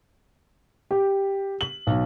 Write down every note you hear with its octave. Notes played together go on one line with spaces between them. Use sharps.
G4
F#7
B1